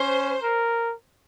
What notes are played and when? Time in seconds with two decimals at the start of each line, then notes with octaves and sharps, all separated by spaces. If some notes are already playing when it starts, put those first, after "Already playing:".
Already playing: C#4 C5
0.42 A#4